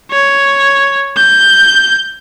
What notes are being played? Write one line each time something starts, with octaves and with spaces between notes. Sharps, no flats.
C#5
G6